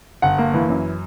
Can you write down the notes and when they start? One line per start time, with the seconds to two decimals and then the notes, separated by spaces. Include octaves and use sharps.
0.22 G1 F#5
0.38 A#3
0.54 E3
0.69 F#2